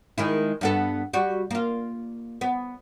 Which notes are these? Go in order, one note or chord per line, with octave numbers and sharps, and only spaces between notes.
D#3 G#3 E4
G2 B3 A4
G3 F#4
A#3 F4
B3